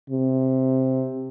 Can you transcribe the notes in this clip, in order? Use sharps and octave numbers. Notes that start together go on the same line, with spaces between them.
C3